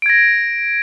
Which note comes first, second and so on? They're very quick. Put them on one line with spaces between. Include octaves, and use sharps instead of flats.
D7 G#6 A#6